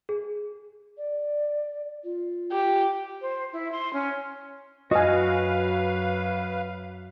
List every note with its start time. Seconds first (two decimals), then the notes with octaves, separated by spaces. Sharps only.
0.09 G#4
0.98 D5
2.04 F4
2.52 G4
3.21 C5
3.53 E4
3.72 C6
3.93 C#4
4.91 F#2 F#4 B4 D#5 F5 G#5 F6